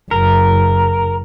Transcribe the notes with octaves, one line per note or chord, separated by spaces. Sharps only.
F#1 A#4